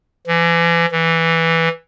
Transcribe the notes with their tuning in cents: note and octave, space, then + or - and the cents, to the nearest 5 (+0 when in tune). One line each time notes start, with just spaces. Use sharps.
E3 +40
E3 +0